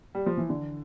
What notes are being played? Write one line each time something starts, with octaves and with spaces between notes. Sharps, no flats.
G3
F3
E3
D3